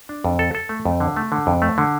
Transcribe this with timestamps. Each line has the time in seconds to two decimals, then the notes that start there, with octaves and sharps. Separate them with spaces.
0.09 D4
0.24 F2
0.39 A4
0.55 A4
0.69 A3
0.85 F2
1.00 D3
1.17 A3
1.32 D3
1.47 F2
1.62 A3
1.78 D3